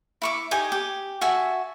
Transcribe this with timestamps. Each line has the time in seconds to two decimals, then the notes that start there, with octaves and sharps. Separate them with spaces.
0.22 E4 C#6 D6
0.51 D#4 G4 G#5 D#6
0.72 G4
1.21 F#4 E5 G#5 A5